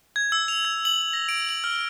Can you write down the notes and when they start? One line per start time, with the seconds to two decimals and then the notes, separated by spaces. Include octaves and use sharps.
0.16 G#6
0.32 E6
0.48 F7
0.65 G#6
0.85 F#7
1.02 F#7
1.13 A#6
1.29 D7
1.49 F#7
1.64 F6